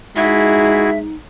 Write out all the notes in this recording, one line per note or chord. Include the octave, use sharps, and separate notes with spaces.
G#3 D#4 E4 F#4 G#4 E5